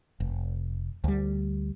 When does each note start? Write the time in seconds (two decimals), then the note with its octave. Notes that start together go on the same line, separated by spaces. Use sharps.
0.20 F1
1.04 D2 G3